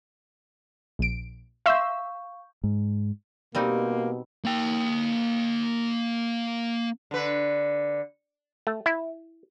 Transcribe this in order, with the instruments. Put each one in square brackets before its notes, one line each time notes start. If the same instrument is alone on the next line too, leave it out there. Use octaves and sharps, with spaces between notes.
[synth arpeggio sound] A#1 D7
[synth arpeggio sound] E5 C6 E6 [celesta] F5 C#6 G6
[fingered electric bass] G#2
[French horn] B2 [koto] G3 C4 D#4 [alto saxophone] A#3 [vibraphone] G4
[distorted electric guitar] A#3 G5
[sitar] D3 B4
[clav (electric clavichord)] A3
E4